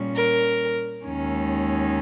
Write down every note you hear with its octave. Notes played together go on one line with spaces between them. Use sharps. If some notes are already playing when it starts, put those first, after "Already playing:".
Already playing: A#2 G3 C#4
A#4
D#2 D#3 G#3 C#4